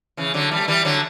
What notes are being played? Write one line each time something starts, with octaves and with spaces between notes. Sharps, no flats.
C#3 E3
D3 F#3
E3 G3
A3
E3 G3
D3 F#3